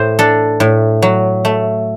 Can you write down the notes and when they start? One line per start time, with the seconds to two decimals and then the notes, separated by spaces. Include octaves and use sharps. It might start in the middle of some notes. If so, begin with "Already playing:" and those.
Already playing: A2 C5
0.19 D4 A4
0.60 A2
1.02 F#3
1.45 A3